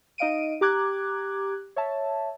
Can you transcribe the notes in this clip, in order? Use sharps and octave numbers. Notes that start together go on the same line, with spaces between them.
D#4 D#5 F5 D7 D#7
G4 A#5 D6 F#6 G#6
C#5 E5 A5